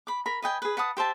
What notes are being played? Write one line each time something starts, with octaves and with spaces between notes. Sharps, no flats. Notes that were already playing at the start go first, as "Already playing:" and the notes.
B5 D6
A#4 B5
B4 D#5 G5 G#5
G#4 B4
B4 F#5 A5 D#6
G4 C5 E5 A5